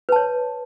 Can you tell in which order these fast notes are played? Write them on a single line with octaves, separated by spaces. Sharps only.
B4 A5 C#5